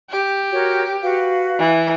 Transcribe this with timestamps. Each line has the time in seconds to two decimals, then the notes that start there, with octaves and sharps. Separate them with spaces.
0.10 G4
0.53 F#4 A#4 C#5
1.02 F#4 B4 F5
1.59 E3